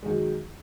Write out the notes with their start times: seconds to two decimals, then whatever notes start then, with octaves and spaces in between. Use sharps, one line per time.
0.03 G#3
0.06 D#3
0.09 F#3